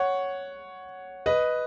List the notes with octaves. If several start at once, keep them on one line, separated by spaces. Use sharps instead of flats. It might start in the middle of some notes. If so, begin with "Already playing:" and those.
Already playing: C#5 F#5
B4 D#5